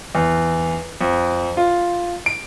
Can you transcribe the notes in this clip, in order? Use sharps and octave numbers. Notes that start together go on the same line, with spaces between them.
E2
F2
F4
D7